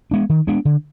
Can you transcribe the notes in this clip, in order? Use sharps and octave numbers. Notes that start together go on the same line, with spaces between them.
G#3 B3 D4
D#3
G#3 B3 D4
D3